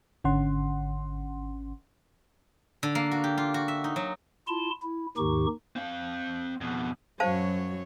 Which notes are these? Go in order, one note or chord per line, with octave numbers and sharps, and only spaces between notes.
G#1 D3 C#4 F#5 C6
D3
A#3
F#4
G4
F4
F#4
E5
D#4
F#3
E4 F4 A5 C6
E4
D#2 G#2 D#3 D#4 G4 C#6
C4 F5
F2 B2
F#2 F#3 C5 C#5 F5 A5